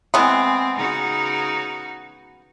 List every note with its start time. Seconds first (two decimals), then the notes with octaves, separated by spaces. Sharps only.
0.14 E3 G#3 B3 C4
0.76 C#3 D#4 F#4